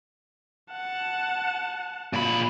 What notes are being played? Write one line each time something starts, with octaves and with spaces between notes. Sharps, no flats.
F#5 A5
A#2 B5